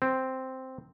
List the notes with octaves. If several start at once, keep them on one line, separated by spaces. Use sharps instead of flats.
C4